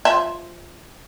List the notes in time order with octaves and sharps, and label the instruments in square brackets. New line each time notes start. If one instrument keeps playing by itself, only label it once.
[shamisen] F3 E5